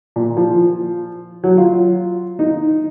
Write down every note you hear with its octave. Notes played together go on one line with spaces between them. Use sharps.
A#2
F3
F#3
F4
D#4